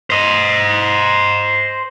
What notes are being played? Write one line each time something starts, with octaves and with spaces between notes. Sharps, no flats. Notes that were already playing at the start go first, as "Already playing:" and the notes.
C5 D#5